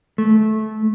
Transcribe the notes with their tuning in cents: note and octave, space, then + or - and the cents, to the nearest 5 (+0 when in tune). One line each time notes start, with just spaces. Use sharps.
A3 -20